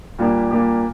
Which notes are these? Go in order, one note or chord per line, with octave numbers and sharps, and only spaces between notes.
A#2 G3 A#3 D4 G4
A#2 G3 A#3 D4 G4